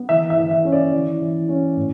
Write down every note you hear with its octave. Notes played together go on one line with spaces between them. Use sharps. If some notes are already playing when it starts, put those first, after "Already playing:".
Already playing: B3
E3 E5
E5
E3
E5
C#4
D5
E3
E3
C#4
A2